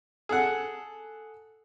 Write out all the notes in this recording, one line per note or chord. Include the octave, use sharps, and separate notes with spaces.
G#4 A4 F#5